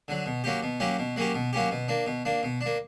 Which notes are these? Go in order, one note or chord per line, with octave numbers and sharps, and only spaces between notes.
D3 F#3
B2
F#3 A#3 C#4 G4
B2
F#3 A#3 C#4 G4
B2
F#3 A#3 C#4 G4
B2
F#3 A#3 C#4 G4
B2
A#3 D4
B2
A#3 D4
B2
D4
A#3